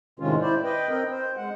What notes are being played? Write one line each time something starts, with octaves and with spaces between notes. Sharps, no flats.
A2 C3 D#3 G#3 C#4 F4
E4 C5 D5
B4 D#5 G5
C4 A#4 D#5 G5
C5
G#3 F#5